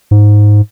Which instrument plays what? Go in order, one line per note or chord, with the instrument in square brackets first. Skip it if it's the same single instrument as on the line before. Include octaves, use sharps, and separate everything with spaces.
[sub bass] G#2